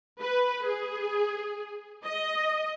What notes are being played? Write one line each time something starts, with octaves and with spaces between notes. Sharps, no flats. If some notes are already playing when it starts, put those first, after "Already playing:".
B4
G#4
D#5